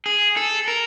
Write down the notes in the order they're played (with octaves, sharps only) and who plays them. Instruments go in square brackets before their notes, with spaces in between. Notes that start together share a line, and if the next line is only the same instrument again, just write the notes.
[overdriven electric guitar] G#4
A4
A#4